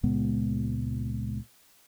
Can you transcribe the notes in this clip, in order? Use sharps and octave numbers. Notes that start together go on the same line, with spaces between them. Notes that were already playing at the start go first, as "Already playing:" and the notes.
C#2 A#2 G#3 B3